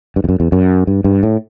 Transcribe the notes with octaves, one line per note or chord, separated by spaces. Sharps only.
G2
E2
F#2
E2
F#2
G2
G2
A2